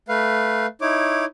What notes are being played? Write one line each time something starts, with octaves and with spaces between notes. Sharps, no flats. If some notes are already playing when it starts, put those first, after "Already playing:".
A3 B4 F5
D#4 E4 C#5 D6